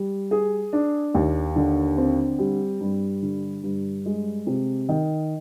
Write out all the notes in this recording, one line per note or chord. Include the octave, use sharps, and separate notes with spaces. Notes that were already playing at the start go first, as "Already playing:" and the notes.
Already playing: G3
G#4
D4
D#2
D3
C4
G3
G2
D3
G2
G#3
C3
D#3